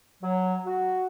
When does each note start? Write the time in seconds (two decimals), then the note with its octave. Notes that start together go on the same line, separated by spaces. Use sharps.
0.22 F#3
0.64 F#4